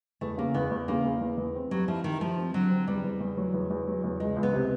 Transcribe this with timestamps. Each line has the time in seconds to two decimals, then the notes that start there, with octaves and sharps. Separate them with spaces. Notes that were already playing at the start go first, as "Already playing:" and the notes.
0.21 E2 A3
0.38 C#3 A#3
0.54 E2 B3
0.71 E2
0.88 C#3 A#3
1.04 E2
1.21 E2
1.37 E2
1.55 C4
1.71 F#3 G3
1.88 F3 E4
2.04 D#3 G3
2.21 F3 G3
2.38 C4
2.54 D3 F#3
2.70 C4
2.88 E2 G3
3.04 E2
3.20 E2
3.37 F#3
3.54 E2
3.70 E2
3.88 F#3
4.04 E2
4.20 C#2 G#3
4.36 C#2
4.43 B3
4.53 C3